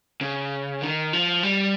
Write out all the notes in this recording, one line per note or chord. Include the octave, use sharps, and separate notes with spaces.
C#3
D#3
F3
G3